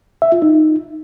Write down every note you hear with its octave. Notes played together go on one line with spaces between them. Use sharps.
E5
F4
D#4